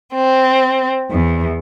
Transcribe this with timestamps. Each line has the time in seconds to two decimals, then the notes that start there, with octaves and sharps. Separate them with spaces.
0.14 C4
1.11 E2